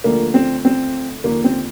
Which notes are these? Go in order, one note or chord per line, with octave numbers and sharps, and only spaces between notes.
D2 D3 F3 A#3
C4
C4
D#2 D3 F3 A#3
C4